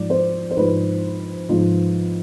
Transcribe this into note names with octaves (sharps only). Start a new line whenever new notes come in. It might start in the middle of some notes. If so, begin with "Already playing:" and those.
Already playing: G#2 F3 G#3 D5
C5
C5
G#2 F3 G#3 B4
G#2 F3 G#3